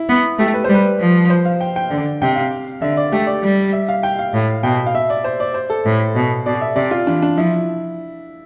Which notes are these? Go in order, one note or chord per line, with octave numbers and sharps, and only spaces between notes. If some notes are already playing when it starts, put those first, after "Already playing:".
Already playing: E4
B3
A3 G4
B4
G3 C5
B4
F3
C5
F5
G5
G5
D3
C3 G5
F5
D3 E5
D5
A3 G4
D5
G3
E5
F5
G5
F5
A2
B2 G5
F5
E5
D5
C5
D5
C5
A4
A2
B2
B2 D5
E5
C3 D5
F4
E3 D4
D4
F3 E4